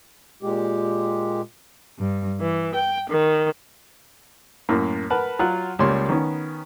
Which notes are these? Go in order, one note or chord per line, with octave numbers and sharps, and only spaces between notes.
A#2 G#3 G4
G2
E3
G5
D#3
F#2 A2 A#3
A#4 B4 F#5 A5 B5
F#3 F4 F#5 F#6
C#2 G3 A#3 C#5 C6
D#3 B3 C#4